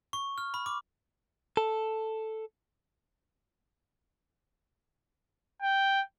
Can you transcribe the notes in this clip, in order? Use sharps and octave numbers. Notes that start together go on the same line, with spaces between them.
C#6
F6
B5
D6
A4
G5